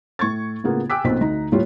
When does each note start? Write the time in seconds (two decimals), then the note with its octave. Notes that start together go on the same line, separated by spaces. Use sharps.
0.19 A2 C#6 G#6 A6
0.64 A2 C#3 A#3 B3 F4
0.90 G5 G#5 D6 E6 F#6 B6
1.04 B1 A#2 C4 B6
1.21 D2 D#4 A#5
1.52 D#1 A2 G3 F4 C#5